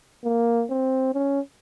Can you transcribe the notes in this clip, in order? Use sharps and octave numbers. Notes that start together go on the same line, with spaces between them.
A#3
C4
C#4